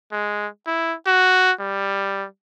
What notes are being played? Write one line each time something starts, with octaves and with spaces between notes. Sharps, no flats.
G#3
E4
F#4
G3